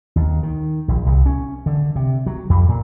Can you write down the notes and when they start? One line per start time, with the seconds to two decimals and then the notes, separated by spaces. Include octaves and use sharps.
0.16 D#2
0.43 D#3
0.88 A#1
1.06 C2
1.26 C#4
1.66 D3
1.96 C3
2.26 F#3
2.50 F2
2.68 A#2